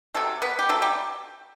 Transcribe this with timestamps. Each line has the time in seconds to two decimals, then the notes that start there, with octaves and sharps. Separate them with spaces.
0.14 C3 F#3 A3 A4
0.42 B3 B4
0.59 G4
0.69 C3 F#3 A3 A4
0.82 G3 G4